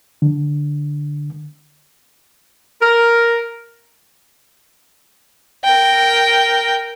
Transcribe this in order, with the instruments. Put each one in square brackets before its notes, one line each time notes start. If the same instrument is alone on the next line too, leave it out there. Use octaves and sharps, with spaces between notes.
[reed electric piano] D3
[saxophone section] A#4
[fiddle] A#4 G5